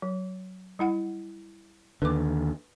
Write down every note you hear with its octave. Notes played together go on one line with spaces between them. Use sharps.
F#3
G3 E4 F#5
D#2 D3 B4 D6